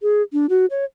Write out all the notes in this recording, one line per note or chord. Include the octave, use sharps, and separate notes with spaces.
G#4
D4
F#4
C#5